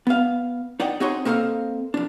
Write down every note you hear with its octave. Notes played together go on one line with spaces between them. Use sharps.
B3 F5
D#4 D5 F#5 G5
C4 D#4 F#4 G#4 C#5 C6
A#3 C4 A4 D#5 F5
F2 D4